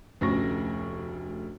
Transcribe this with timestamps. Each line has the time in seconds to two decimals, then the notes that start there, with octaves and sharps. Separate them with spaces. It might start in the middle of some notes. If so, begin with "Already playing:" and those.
0.21 F1 D2 C#4 C#6 A#6